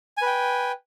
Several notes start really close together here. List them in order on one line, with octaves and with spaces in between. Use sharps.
G#5 B4 G5